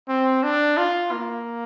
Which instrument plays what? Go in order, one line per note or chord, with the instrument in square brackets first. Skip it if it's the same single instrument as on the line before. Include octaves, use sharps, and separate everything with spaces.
[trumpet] C4
D4
F4
A#3